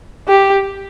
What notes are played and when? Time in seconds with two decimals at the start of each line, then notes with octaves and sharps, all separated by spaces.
0.28 G4